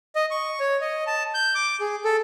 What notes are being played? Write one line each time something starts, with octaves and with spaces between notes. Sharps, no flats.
D#5
C#6
C#5
D#5
A5
G6
D6
G#4
A4